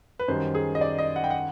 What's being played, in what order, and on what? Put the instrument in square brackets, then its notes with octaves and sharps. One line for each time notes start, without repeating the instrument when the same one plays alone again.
[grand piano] B4
[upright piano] F#2 D#3 G3 [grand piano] C5
[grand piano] G#4
D#5
D5
D#5
F#5
G5
F#5